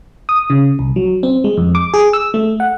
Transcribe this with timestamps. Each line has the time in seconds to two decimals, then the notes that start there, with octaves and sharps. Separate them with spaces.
0.29 D#6
0.50 C#3
0.79 C2
0.96 F#3
1.23 C4
1.44 G#3
1.57 F2
1.75 D6
1.94 G#4
2.13 E6
2.34 A3
2.60 F#5